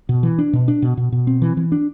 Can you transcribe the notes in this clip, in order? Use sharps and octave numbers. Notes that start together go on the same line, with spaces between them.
B2
E3
D4
B2
D4
B2
B2
B2
C4
E3
E3
D4